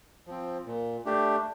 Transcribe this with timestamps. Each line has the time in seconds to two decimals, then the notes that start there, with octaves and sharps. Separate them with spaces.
0.27 F3 C4
0.66 A#2
1.05 A3 D4 G4